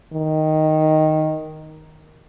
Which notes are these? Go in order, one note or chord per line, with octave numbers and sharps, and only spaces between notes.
D#3